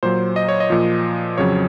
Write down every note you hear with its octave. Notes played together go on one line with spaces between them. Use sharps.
A#2 F#3 C5
D#5
C#5
D#5
A#2 F3
F2 C#3 F#3 C#5